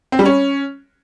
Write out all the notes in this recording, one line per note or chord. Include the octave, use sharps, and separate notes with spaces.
C4
G3
C#4